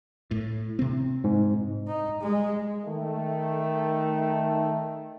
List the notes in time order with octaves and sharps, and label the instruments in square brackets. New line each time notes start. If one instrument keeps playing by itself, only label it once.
[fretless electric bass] A2
C3 C4
[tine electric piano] G#2
[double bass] D#4
G#3
[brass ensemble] D#3 A3